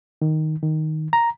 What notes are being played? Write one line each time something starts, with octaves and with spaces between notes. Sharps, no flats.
D#3
D#3
A#5